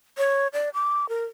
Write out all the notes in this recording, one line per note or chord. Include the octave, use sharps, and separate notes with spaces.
C#5
D5
D6
A#4